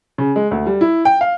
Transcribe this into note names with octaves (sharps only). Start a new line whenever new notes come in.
C#3
G#3
D2
G3
E4
G5
F5